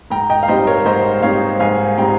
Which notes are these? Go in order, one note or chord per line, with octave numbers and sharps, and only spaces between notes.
G#2 G5 A#5
D#5 G5
F5
G3 C4 D#4 C5 D#5
A#4 C#5
G#2 C5 D#5
G3 C4 D#4 C#5 F5
G#2 F5 G#5
G3 C4 D#4 G5 A#5